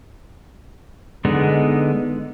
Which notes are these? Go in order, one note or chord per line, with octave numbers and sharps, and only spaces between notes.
D3 G#3 B3 D#4